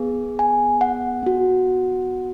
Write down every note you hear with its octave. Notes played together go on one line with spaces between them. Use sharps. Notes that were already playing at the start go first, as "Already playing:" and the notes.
Already playing: B3 G#4
G#5
F#5
B3 F#4